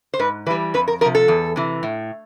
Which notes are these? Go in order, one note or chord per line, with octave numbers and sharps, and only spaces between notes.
C5
G#2 B4
E3 G3 B4
F2 B4
A#4
C3 F3 A#4
A4
E2
C3 E3
A2